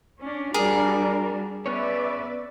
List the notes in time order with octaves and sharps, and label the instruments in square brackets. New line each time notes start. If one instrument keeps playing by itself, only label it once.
[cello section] C#4 D4
[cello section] G3 D4 F#4 [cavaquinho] G#4 [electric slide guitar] A#4
[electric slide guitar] B3 C#4 C#5 [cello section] B4 D5 E5